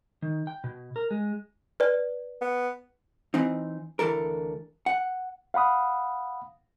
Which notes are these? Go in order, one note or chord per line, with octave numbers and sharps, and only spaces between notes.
D#3
G5
B2
A#4
G#3
B4 D5
B3
E3 C4 D#4
D2 E3 A4 A#4
F#5
F5 F#5 B5 D#6